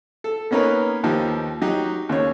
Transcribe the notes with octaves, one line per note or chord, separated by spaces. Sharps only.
A4
A#3 B3 C#4 D#4 A#4 B4
D#2 F3 D#4 G4
F#3 D#4 G4
D#2 C#3 C#5